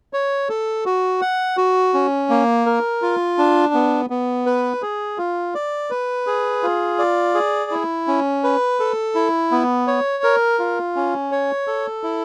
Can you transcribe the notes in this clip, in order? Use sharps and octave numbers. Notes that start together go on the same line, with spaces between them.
C#5
A4
F#4
F#5
F#4
C#4
A#3
A#4
F4
D4
B3
B3
B4
G#4
F4
D5
B4
G#4
F4
D5
G#4
E4
C#4
B4
A4
E4
B3
C#5
A#4
F4
C#4
C#5
A4
E4